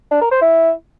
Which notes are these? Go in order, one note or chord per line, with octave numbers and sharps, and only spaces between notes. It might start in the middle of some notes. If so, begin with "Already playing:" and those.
D4
A#4
C5
E4